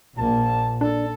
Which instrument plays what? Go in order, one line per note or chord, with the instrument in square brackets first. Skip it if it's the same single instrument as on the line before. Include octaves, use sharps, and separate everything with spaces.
[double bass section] A#1 [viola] A#3 [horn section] A5
[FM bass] D4 [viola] A4